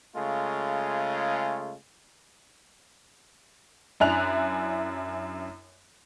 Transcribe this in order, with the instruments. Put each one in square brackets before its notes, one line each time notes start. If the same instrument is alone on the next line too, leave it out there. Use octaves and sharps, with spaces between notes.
[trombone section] C#3 G#3 A3 F4
[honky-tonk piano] F#2 D4 E4 G#5 F#6 F7